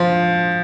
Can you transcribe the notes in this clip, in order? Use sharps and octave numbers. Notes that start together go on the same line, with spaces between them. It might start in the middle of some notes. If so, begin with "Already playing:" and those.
Already playing: F3